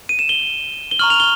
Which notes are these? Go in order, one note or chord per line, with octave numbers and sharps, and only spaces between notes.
D#7
E7
G7
G7
A#5 C#6 F6 F#7
F7
G7